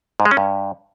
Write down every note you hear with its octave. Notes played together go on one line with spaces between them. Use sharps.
G#2
G#3
C#4
G2